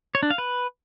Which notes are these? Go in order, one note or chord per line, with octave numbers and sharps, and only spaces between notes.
C#5
D4
F5
B4